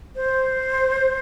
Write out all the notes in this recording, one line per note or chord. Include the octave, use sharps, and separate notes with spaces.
C5